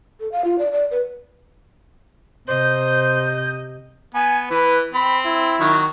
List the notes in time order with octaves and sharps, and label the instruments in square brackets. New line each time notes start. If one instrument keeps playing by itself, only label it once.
[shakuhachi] A4
F5
F4
D5
D5
B4
[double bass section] C3 [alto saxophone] C5 [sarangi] D#5 [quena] G6
[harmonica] B3 [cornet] G#5
[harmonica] E3 [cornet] B4
[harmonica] C4 [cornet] B5
[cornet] E4
[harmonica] D#3 F#3 C#6